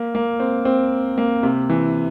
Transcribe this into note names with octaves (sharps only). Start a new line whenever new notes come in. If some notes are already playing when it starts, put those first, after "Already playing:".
Already playing: A#3
A#3
C4
C4
A#3
C3
E3